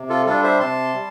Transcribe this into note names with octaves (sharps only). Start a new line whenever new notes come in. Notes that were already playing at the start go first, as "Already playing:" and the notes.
Already playing: C3
F4 A4
G3 D4 F4 A4
C5 E5
C3 A5 C6
G3